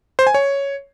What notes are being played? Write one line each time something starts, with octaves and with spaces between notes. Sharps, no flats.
C5
G#5
C#5